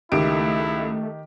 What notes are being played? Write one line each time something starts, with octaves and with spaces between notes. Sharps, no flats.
C#2 D#3 A3 E4 G4 D7